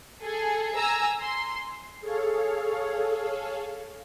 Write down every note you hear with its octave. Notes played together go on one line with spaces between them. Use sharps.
G#4 A4
G#5 A#5 E6
C6
G#4 A4 C#5 F5